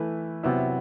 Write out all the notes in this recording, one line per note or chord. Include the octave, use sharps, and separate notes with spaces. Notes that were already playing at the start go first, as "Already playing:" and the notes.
Already playing: E3 A3 E4 B4
C3 F#3 B3 E4